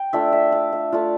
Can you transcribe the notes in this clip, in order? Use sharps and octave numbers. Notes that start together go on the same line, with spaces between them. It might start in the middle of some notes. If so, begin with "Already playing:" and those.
Already playing: G5
A3 D4 F4 E5
E5
F5
E5
A3 D4 F4 F5